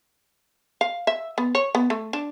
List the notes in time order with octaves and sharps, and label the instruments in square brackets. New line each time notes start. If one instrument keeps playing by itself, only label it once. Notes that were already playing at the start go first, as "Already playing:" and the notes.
[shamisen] F5
E5
B3
C#5
B3
A3
D4